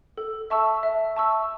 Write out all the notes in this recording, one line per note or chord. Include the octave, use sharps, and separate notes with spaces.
A4
E5 A5 C#6 E6
E5
A5 C#6 E6